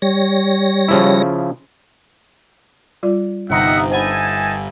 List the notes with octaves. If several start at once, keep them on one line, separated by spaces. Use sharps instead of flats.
G3 C#5 A#6
C#3 F3 E4
G3 F4 D5
G1 C3 D#4 D#5 E5 F#5
D#4 C5 E5 F#5 G#5 A5 B5